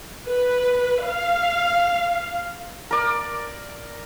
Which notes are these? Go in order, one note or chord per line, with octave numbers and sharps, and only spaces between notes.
B4
F5
A#4 D5